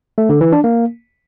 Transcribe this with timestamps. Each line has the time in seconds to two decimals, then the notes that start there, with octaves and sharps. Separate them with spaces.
0.18 A3
0.29 D3
0.41 E3
0.52 D4
0.64 A#3